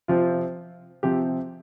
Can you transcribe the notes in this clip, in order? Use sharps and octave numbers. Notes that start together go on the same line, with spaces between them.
C3 F3 C4 F4
C3 F3 C4 G4